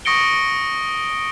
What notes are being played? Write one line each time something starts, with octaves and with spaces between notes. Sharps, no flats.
C#6 D#6 A#6 C#7 D7 G7